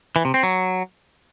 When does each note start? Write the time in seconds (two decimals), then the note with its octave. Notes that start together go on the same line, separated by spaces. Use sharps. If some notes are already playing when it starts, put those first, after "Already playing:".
0.16 E3
0.25 C3
0.34 C4
0.43 F#3